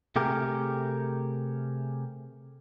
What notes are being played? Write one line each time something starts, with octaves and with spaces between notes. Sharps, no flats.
C3 A3 G4 G#4 A#4